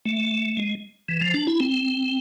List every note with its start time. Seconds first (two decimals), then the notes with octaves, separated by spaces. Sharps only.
0.06 A3
0.57 G#3
1.09 E3
1.21 F3
1.34 D4
1.47 E4
1.60 C4